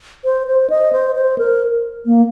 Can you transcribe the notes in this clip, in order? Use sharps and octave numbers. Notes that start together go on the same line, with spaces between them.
C5
C5
D#5
C5
C5
A#4
A#3